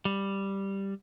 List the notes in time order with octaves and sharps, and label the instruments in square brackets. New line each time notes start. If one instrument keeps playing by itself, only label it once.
[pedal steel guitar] G3